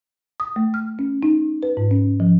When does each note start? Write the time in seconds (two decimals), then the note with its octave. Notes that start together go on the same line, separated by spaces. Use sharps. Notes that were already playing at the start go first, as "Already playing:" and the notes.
0.40 D#6
0.56 A3
0.74 F6
0.99 C#4
1.23 D#4
1.63 B4
1.77 G#2
1.91 C#4
2.20 F3